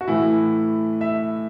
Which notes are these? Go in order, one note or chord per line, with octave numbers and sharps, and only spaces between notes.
F#4
A2 E3 E4
E5